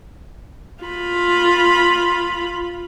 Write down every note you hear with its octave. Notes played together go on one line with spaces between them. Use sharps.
F4 B5